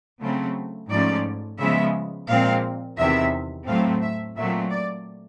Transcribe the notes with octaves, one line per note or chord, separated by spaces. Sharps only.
C#3 F#3 A3 C4
G#2 F3 A3 C#4 D5
C#3 F3 G#3 B3 E5
A#2 F3 G#3 C4 F5
E2 C3 D#3 E5
A2 F#3 A3 C4 F5
E5
A#2 F#3 A3 C4 E5
D5